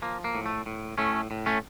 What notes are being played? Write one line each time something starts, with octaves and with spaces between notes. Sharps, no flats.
F3 A#3
A#3
A2
A3
A2
A2 A3 C#4
A2
A3 C#4